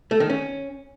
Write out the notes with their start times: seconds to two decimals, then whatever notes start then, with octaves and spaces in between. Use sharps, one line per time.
0.11 A3
0.20 D#3
0.30 C#4